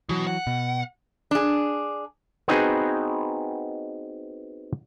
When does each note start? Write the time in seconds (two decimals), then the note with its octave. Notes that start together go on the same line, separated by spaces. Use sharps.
0.09 B2 E3 F#3
0.27 F#5
0.47 B2
1.31 D4 G#4
2.48 B3 C4 D#4 F#4 G#4 B4